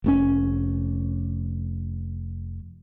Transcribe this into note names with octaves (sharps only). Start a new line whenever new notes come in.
F1 B2 C#4